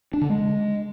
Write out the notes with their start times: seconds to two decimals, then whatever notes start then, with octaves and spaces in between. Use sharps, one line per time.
0.14 D4
0.21 D3
0.29 G#3